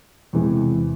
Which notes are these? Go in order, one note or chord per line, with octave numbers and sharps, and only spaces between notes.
E2 C3 E3 G#3